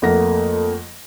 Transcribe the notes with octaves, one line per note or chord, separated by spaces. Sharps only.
F2 A3 A#3 F#5 A#6